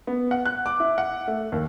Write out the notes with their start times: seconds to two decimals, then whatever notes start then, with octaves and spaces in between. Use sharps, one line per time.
0.07 B3
0.31 F#5
0.46 F#6
0.66 D6
0.80 E4
0.98 F#5
1.28 A3
1.52 D#2